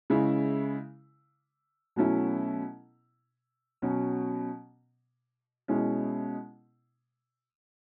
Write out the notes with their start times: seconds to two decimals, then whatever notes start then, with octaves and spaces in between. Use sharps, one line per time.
0.10 C#3 G#3 C#4 E4
1.96 B2 F#3 A3 C#4 E4
3.82 B2 F#3 C#4
5.68 B2 G#3 C#4 E4